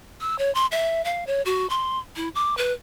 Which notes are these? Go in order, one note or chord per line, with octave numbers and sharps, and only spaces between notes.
E6
C#5
C6
E5
F5
C#5
F#4
C6
E4
D6
B4